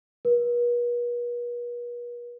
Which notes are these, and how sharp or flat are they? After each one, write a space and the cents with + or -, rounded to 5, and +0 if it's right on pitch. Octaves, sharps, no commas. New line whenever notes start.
B4 -45